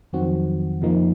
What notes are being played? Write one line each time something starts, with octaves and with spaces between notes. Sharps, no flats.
F2 D#3 F#3 C4 F#4
F2 C3 F3 A#3 D#4